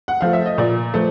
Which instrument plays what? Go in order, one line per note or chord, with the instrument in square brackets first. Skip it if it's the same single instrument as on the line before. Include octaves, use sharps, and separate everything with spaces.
[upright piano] F#5
F3 A3 F5
E5
D#5
A#2 D5
F3 A3